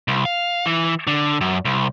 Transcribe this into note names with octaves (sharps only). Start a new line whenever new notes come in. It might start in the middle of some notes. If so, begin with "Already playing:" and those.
C2
F5
E3
D3
F#2
C2